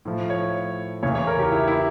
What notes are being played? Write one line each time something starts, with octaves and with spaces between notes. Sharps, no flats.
A2 F3
C#5
E2 C#3 E3 C#5
C#5
A#4
G4
E4
E4